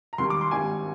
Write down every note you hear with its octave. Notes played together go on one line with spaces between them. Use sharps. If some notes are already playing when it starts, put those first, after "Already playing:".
A#5
D#2 D#3 G3 C6
D6
C6
G#1 G2 D#3 G3 G#5